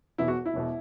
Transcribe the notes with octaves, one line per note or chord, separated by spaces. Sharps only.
E1 E2 B2 E4
F#4
E4
E1 E2 B2